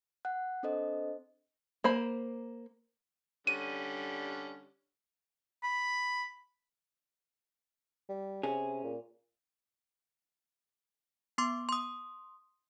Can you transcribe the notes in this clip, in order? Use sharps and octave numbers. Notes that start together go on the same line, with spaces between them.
F#5 F#6
C4 D4 A4 C5 D#5
A#3 C5 B5
D3 G3 C#4 D#7
B5
G3
C3 C#4 G#4
A#2
B3 C6 D6
C6 D#6